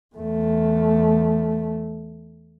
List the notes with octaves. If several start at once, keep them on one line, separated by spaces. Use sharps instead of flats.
E2 A3